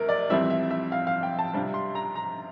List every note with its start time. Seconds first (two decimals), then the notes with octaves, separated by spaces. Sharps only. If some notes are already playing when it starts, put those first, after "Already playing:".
Already playing: D2 C3 A#4
0.09 D5
0.30 F2 E3 G3 C4 E4 E5
0.50 E5
0.71 E5
0.92 F5
1.07 F5
1.23 G5
1.39 A5
1.53 C3 G3 D4 F4
1.74 C6
1.95 A#5
2.15 A#5